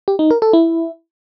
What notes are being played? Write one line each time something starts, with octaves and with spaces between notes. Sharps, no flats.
G4
D#4
A#4
A4
E4